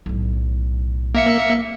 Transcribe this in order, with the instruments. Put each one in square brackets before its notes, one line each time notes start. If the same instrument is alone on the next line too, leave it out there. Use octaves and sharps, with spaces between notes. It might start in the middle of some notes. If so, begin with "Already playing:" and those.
[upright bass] B1 A2
[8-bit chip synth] A#3 E5 C#7